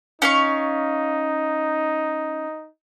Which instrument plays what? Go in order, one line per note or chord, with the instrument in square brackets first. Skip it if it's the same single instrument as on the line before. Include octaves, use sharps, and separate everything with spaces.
[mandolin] C#4 F5 C#6 [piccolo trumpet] D#4